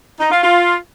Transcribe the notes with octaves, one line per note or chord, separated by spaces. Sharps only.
D#4
F4
F4